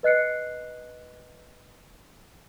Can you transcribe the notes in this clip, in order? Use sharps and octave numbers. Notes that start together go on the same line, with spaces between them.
B4 D#5 F#6 C7 C#7